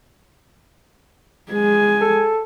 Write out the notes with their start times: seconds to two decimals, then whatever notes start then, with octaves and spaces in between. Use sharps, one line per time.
1.52 G#3 G#5
2.01 A4